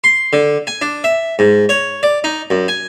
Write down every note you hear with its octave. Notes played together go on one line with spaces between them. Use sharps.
C6
D3
G#5
D4
E5
G#2
C#5
D5
D#4
F#2
G#5